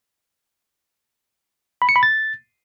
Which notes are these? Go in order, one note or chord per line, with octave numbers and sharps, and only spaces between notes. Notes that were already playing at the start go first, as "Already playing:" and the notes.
B5
C#7
B5
A6